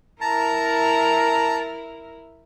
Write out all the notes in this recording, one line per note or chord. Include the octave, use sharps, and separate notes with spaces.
E4 A#4 A5 A#5